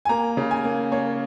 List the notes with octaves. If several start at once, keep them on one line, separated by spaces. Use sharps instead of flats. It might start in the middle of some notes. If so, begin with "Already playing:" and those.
G#5
A#3 A#5
C#3
G#5
A#3
A#3 C#5